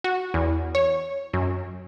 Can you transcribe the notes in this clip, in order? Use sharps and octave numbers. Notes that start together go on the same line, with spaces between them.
F#4
E2
C#5
F#2